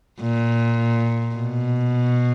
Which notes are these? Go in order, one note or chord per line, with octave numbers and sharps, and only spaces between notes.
A#2
B2